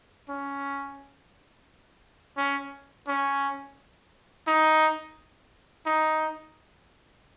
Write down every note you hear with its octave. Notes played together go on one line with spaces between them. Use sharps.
C#4
C#4
C#4
D#4
D#4